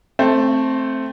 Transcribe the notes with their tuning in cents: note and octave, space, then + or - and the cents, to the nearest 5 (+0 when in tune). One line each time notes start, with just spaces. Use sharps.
A3 +0 C4 +10